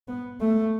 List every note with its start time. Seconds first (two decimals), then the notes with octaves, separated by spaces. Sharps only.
0.08 B3
0.41 A3